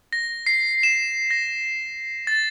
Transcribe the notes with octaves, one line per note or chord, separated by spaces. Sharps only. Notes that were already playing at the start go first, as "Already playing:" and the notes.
A#6
C7
E7
A#6
A6